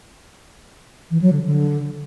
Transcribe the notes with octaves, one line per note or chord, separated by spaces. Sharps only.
E3
F#3
D3
D3